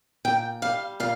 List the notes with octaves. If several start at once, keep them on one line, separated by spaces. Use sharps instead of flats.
A#2 G5
G3 F5
A#2 F5